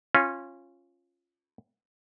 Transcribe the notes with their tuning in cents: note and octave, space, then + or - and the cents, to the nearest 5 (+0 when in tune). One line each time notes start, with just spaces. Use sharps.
C#4 -15 F4 +0